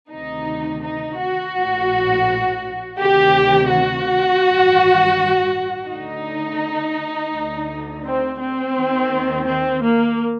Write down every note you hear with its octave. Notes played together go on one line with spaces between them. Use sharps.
D2 C3 D#3 D#4
D#4
F#4
A#1 A2
D2 C3 D#3 G4
F#4
A1 G2 D#3
D2 D3 D#4
D2 D3
C4
C4
D#2 D#3
C4
A#3